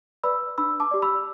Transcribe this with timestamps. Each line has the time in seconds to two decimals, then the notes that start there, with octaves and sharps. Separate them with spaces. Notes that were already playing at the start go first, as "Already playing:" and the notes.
0.23 B4 D5 B5 E6
0.58 D4 B5 E6
0.80 A5 D6
0.91 G4 D5
1.02 B5 E6